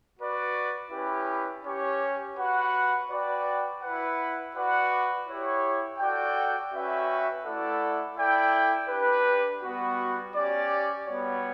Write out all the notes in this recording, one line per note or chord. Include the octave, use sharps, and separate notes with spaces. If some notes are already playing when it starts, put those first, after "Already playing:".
F#4 B4 D5
C#4 E4 G4 B4
C#4 G4 C#5
F#4 B4 F#5
F#4 B4 D5 G5
E4 B4 F#5
F#4 B4 D5 F#5
E4 G4 C#5
F#4 A4 D5 G5
C#4 F#4 B4 E5 G5
A3 E4 A4 D5 F#5
E4 A4 D5 G5
D4 G4 B4
G3 B3 F#4
C#4 G4 D5
G3 B3 F#4 C#5